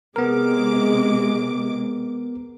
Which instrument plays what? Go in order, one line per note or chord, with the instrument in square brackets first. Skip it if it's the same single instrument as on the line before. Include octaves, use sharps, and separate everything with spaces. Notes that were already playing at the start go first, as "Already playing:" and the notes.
[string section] C3 G#3 D6 [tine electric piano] B3 A#4